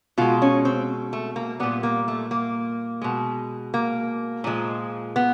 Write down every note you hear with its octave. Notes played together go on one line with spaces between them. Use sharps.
B2 G#3 F4
C#4
C4
A3
A#3
A#2 G3 B3
A#3
A3
A#3
B2 G#3
A#3
A#2 F3 G#3
B3